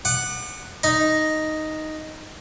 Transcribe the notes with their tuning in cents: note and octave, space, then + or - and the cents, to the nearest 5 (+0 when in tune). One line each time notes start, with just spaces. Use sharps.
F#5 +0 D6 +45
D#4 +0 D#5 +0